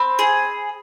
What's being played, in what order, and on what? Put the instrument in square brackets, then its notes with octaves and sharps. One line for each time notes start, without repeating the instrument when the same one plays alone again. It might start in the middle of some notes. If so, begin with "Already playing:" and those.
Already playing: [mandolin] C4 B5
G#4